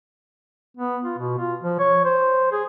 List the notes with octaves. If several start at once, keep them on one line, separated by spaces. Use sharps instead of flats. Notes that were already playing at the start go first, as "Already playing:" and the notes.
B3
F4
B2
F4
F3
C#5
C5
G#4